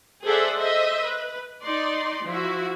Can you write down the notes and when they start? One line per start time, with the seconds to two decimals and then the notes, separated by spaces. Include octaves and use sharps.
0.24 G#4 A4 C5 D5 E5 F#5
0.55 C5 D#5 E5
1.04 B4
1.62 D#4 D5 C6
2.26 F3 E4 F#4